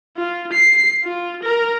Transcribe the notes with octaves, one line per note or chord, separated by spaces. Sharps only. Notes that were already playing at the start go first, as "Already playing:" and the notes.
F4
C7
F4
A#4